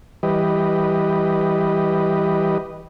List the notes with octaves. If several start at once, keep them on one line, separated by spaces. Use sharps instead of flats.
E3 G3 G4 B4 D#5